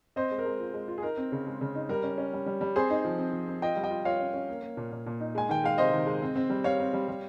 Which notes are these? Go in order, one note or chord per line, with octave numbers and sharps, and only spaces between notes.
C4 C5 D#5
G#3
A#4
G#3
F4
G#3
F4
G#4
D#4 A#4
C4
C#3
G#3
C#3
D#4
G3 A#4
C#4
C#4
G3
G3
G3
C4 G#4 C5
D#4
F3
C4
F3
C4
F4 D#5 G5
G3
D#5 G5
F4
F4 C#5 F5
C#4
C#4
A#3
A#3
A#2
A#2
A#2
D#4
G#3 G#5
D#3 G5
G#3 F5
C3 C5 D#5
D#3
G#3
C4
C4
G3
G3 C#5 F5
C4
G3
G3